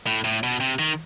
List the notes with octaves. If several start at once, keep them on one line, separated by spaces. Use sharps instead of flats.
A2
A2
B2
C3
D#3